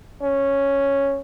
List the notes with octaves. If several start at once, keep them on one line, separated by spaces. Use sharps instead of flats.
C#4